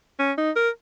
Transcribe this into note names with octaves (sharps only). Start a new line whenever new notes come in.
C#4
D#4
A#4